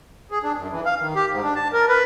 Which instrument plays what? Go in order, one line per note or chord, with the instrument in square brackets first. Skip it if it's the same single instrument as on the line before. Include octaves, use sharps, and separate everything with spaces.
[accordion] G#4
D4
F#2
E3
F5
D#3
G4
G#2
D4
A5
A#4
B4